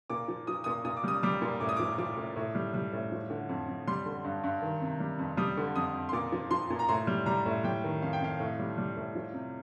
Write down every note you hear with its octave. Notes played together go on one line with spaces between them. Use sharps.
A#2 D6
F3
F3 D#6
A#2 D#6
A#2 D#6
D6
G3 D#6
G3 D6
A#2
A2 D6
D#6
F3 D6
F3 D6
A2
A2
G3
G3
A2
F3
D3
F2
F2
G3 C6
D3
G2
G2
D#3
C3
G3
F2
G3 D#6
D3
F2 D#6
F2
C6
A#2 D6
F3
F3 C6
A#2
A#5
A2 C6
G3
G3 A#5
A2
G3 G5
D#3
F2 F5
G5
F2 F5
A2
G3
G3
A2
F3
C3